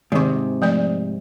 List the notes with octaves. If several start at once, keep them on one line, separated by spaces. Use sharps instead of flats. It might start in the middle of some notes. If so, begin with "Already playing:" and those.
G#2 C3 D#3 C#6
F3 A3 D5